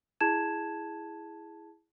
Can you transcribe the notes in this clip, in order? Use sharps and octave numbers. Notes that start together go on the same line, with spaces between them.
E4 G#4 A5 G#6 E7